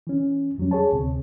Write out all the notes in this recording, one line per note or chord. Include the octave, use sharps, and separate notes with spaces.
E3 C#4
F2 F#3 G3 C#4
G#4 C#5 A5
D2 C3 C4